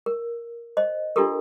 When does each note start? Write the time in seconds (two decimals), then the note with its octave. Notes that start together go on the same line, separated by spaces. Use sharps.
0.06 A#4
0.77 C5 D#5
1.16 D4 E4 F4 G4 A4 A#4